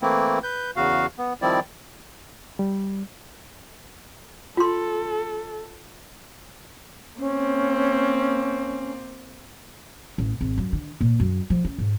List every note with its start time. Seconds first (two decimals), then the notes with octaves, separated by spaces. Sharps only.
0.02 E3 A3 A#3 C4 E4
0.43 B4 G6
0.76 E2 C#3 F#4 F5
1.18 B3
1.42 D#3 F3 G3 C4 E4 D5
2.59 G3
4.57 F4 A4 C6
7.19 A#3 C4 C#4
10.18 A1
10.41 G#1
10.58 F#2
10.73 D3
11.01 A#2
11.20 F#2
11.50 F3
11.65 C#4
11.78 G#2